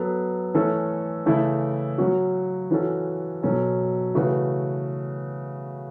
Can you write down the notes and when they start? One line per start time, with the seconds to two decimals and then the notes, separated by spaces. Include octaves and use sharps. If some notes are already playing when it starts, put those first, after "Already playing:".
Already playing: F#3 B3 A4
0.54 E3 A3 C#4 A4
1.26 C#3 E3 A3 E4 A4
1.98 F#3 C#4 F#4
2.71 E3 C#4 F#4 A4
3.43 B2 F#3 C#4 A4
4.15 C#3 E3 A3 F#4 B4